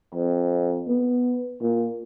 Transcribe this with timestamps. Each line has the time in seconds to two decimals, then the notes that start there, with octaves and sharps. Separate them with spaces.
0.15 F2
0.88 B3
1.61 A#2